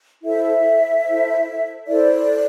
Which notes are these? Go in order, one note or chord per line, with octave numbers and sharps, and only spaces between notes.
E4 A4 C5 E5
E4 A4 C5
E4 A4 C5 D5